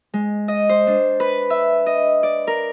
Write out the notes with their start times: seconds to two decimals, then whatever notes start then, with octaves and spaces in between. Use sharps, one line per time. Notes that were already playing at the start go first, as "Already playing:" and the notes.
0.14 G#3
0.48 D#5
0.69 C5
0.87 D4
1.20 B4
1.50 E5
1.86 D#5
2.23 D5
2.47 A#4